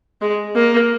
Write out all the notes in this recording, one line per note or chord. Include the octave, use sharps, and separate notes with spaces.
G#3
A#3